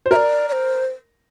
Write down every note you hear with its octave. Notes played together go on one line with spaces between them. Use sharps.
C5
A#4 E5
D5
D5
C5